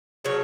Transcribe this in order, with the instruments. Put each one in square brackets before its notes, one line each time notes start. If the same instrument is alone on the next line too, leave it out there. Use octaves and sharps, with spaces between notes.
[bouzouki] C#3 F#3 A3 C#5